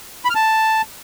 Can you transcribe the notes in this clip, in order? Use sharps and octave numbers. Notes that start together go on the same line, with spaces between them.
B5
F6
A5